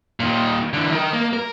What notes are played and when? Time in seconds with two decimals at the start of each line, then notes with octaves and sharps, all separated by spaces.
0.20 A#2 D#3
0.73 D3 E3
0.92 D#3 A#4
1.13 A#3
1.33 A#4